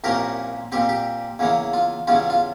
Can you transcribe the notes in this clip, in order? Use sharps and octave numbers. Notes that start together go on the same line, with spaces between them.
C2 A#2 F3 A#3 C#4 G4 A#4
A#2 G3 C4 G4
G4
E2 C#3 E3 A#3
F4
E2 C#3 G3 C#4 F4
F4